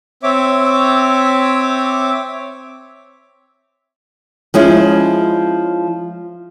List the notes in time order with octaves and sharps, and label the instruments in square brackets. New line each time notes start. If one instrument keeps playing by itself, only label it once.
[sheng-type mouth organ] C4 C#5 E5 D6
[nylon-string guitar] F3 G#3 C#4 E4